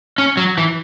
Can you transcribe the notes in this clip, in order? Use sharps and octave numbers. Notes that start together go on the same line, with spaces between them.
C#4
F#3
E3